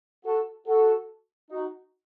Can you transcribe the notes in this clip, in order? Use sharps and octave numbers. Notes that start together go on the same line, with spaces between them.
F#4 A4
F#4 A4
D#4 F#4